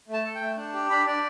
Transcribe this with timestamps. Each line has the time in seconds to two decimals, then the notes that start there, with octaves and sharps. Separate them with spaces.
0.08 A3
0.13 A5
0.25 A4
0.35 G5
0.41 A3
0.57 D4
0.74 G4
0.90 D4 B5
1.07 D4 D5